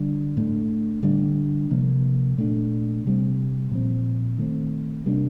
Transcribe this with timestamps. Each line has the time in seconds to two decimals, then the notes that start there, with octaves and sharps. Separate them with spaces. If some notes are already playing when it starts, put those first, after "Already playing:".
Already playing: D3 G3 D4
0.37 A2 A3 D4
1.03 D3 G3 D4
1.70 C3 F3 A#3
2.37 A#2 A3 D4
3.04 C3 G3 C4
3.71 A#2 F3 C4
4.38 D#3 A3 C4
5.06 C3 G3 A#3 D4